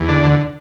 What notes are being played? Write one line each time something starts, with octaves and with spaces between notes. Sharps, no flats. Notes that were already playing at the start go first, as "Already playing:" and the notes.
Already playing: E2
D3 D4
D2